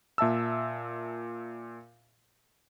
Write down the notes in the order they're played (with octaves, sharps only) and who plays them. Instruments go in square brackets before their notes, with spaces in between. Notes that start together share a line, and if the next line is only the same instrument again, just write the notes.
[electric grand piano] A#2 E5 A5 E6